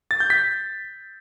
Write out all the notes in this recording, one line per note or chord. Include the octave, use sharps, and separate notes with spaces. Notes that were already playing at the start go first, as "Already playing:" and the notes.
A6
G6
B6